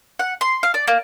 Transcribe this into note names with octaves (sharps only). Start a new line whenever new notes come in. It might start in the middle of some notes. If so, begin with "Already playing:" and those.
F#5
C6
F5
D5
A#3